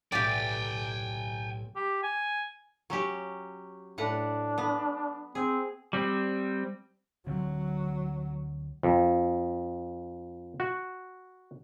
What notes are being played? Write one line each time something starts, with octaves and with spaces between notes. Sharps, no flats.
B1 A2 G4 D5 G5 G#5
G4
G#5
F#3 C#4 G4
A2 D4 B4 F#5
B3
C4 G#4
G3 C4
D2 D3 F#3 C4
F2
F#4